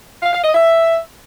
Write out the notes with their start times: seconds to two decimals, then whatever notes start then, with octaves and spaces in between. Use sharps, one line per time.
0.23 F5
0.33 F5
0.44 D#5
0.55 E5